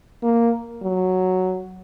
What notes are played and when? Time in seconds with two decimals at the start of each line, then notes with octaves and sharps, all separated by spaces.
0.23 A#3
0.82 F#3